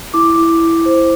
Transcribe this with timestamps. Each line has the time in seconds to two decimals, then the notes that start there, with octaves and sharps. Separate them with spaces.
0.14 E4 D6
0.38 E4
0.61 E4
0.86 C5